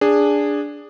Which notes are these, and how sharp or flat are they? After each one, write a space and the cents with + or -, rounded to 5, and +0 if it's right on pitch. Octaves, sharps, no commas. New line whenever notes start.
D4 -5 G#4 -15